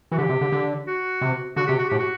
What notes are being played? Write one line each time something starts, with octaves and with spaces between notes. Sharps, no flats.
E3 F#4
D3 G4
C3
D3
D3
F#4
C3
D3 F#4
C3 G4
F#4
A2 G4
F#4